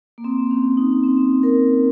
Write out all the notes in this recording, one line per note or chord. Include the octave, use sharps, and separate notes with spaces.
A#3
C4
C#4
D#4
C4
A#4